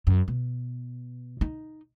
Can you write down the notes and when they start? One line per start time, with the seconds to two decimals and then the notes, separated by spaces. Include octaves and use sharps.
0.07 F#2
0.28 B2
1.41 D#4